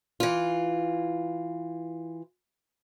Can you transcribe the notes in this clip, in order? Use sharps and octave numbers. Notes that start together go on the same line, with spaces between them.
E3 F4